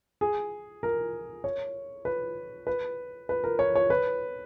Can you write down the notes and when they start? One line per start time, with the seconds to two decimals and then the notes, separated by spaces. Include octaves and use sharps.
0.21 G#4
0.83 A#4
1.44 C#5
2.05 B4
2.67 B4
3.29 B4
3.44 A#4
3.59 C#5
3.75 C#5
3.90 B4